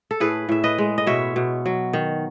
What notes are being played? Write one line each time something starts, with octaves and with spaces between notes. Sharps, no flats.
A4
A2 G#4 B4
A2 E5
B4 D#5
G#3
D#5
B2 C#5 E5
B2
F#3
D#3